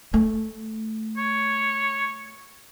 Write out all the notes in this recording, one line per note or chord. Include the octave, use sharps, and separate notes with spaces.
A3
C#5